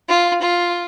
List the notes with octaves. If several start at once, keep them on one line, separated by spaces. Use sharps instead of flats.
F4
F4